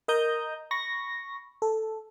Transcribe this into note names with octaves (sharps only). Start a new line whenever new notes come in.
A#4 D#5 A#5 D#6 G6
B5 C#6 A#6
A4